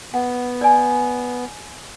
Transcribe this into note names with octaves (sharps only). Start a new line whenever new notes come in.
B3 F#5
D5 G#5